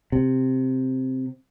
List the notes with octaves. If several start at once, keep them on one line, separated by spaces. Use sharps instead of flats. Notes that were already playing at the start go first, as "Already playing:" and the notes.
C3